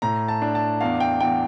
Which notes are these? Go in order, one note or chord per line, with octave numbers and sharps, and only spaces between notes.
A2 A#5
A5
D4
A5
E2 F5
G5
E2 G5